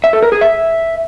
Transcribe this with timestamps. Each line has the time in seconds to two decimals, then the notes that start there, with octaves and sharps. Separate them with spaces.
0.04 E5
0.13 A4
0.23 A#4
0.32 G#4
0.41 E5